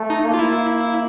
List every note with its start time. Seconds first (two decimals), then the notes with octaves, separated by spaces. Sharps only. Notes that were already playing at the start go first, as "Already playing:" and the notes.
Already playing: A3
0.10 D#4
0.24 A#3
0.34 F4
0.39 E4